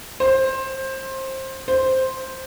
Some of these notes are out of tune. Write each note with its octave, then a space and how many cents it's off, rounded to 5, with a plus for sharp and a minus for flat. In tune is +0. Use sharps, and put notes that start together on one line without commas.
C5 +20
C5 +0